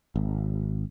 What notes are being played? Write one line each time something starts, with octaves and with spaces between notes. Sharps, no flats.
G#1